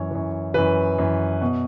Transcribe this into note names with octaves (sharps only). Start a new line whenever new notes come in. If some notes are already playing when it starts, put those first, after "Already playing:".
Already playing: F#2 E3 C#5
F#2 E3
F#2 E3 B4
F#2 E3
B2